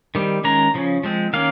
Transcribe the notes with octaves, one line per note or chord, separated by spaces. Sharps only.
D#3 G3 C4
D#3 G#3 C#4 A#5
C#3 F3 C#4
F3 G#3 C4
D#3 A#3 C#4 F5